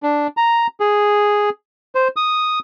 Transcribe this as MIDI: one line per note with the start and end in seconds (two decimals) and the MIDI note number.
0.03 0.27 62
0.37 0.67 82
0.80 1.50 68
1.95 2.08 72
2.16 2.59 87